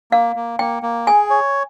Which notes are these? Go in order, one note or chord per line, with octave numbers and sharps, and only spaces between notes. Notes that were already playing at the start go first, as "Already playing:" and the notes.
A#3 F5
A#3
A#3 G5
A#3
G#4 G#5
C#5